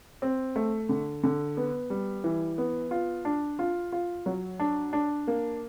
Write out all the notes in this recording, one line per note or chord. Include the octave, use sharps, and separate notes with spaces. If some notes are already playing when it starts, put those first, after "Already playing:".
C4
A3
D3
D3
B3
G3
E3
B3
F4
D4
F4
F4
F#3
D4
D4
A#3